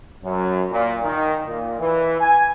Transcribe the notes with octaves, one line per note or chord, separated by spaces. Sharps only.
F#2
A#2
D#3
A#2
E3
G#5